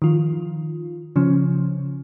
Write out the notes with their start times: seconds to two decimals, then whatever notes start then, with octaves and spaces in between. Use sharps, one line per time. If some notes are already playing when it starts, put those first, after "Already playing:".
0.02 D#3 F3 F4
1.16 C#3 F3 C#4